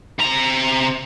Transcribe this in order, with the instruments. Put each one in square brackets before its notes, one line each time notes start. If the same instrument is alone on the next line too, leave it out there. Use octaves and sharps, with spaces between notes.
[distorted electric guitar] C3 A#5